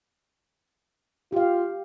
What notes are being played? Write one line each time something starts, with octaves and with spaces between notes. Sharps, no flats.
F4 G4 F5